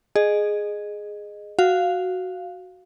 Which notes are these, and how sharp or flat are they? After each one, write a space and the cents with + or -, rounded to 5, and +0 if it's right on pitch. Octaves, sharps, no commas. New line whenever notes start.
G#4 +5 D#5 -20
F#4 +0 F5 +0